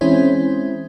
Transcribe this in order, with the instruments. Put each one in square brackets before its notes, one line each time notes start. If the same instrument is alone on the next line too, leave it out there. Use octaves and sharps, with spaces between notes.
[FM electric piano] E3 G#3 C4 C#4 E4 C5